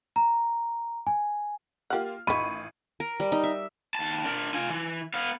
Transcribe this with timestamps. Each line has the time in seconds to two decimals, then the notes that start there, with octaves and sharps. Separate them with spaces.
0.16 A#5
1.07 G#5
1.90 A#3 F4 G4 F#5 F6
2.27 A1 D#3 F4 B5 C#6 D#7
3.00 A#4
3.20 G3
3.32 D#4
3.44 E5
3.95 D#2 A5
4.25 D4 A#4
4.54 F4 G#5
4.70 E3
5.14 B3 F5